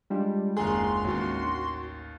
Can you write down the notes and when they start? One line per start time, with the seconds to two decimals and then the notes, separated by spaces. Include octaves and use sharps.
0.10 G3 G#3 D4 F4
0.57 F#1 D#2 G#4 A#5 C6
1.04 A1 D#2 F#4